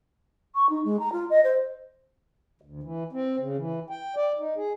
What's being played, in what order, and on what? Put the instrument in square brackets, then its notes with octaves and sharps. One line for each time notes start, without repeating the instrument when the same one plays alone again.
[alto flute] C#6
D#4
G#3
A#5
F4
D#5
C5
[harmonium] D2
E3
C4
C#3
E3
G5
D5
D#4
G#4